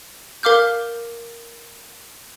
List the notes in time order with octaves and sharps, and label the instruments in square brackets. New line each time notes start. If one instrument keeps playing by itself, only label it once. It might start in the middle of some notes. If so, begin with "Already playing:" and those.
[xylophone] A#4 F5 D6 F6 G6